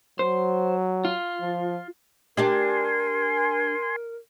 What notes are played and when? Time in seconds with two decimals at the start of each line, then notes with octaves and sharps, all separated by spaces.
0.19 F#3 C5
1.05 F4
1.41 F3
2.37 D4 G4 A#4 D5 G#5 C6